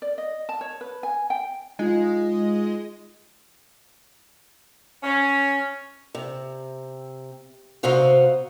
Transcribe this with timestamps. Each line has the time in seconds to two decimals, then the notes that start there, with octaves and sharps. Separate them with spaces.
0.02 D5
0.18 D#5
0.49 A5
0.61 C#5
0.81 B4
1.03 G#5
1.30 G5
1.79 G#3 D#4 F4
5.03 C#4
6.15 C3
7.83 G#2 C3 B3 C4 F#4 F5